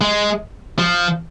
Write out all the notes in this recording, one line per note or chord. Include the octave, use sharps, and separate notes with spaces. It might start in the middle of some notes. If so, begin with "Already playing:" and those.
G#3
F3